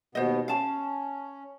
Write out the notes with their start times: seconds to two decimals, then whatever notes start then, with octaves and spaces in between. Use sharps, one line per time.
0.15 D#2 B2 B3 C5 D#5
0.48 C#4 F5 A5